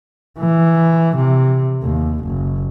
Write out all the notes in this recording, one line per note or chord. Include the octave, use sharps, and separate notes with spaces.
E3
C3
D#2
F#1